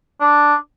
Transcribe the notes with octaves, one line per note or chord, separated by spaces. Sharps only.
D4